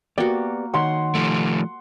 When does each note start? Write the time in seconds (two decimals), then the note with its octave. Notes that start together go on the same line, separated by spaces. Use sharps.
0.18 A#3 B3 F#4 G4 D5
0.74 D#3 C#5 F#5 C6
1.15 F3 A3